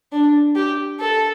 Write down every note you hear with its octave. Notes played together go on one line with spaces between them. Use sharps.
D4
G4
A4